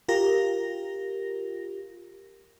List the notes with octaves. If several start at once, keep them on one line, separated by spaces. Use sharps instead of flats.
F4 G4 A#4 A#6